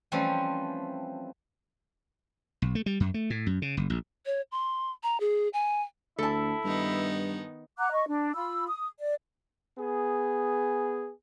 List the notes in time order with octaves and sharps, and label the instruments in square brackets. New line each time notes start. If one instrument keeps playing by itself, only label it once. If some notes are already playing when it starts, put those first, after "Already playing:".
[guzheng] E3 F3 G3 A3 C4 C#4
[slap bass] B1
A3
G3
F#2
A3
A2
F#2
C#3
F#1
A#1
[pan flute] C#5
C6
A#5
G#4
G#5
[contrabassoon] D2 [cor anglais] E4 [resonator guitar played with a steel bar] A4 A5
[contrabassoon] G2 [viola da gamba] D#3 B3 D#4
[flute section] F#5 A#5 D6 F#6
D#5 C#6
D4
F4 B5 E6
D#6
D5
[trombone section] B3 G#4